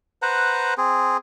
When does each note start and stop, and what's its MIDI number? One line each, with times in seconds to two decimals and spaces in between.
0.22 0.74 71
0.22 0.74 72
0.22 0.74 78
0.22 0.74 82
0.78 1.17 60
0.78 1.17 68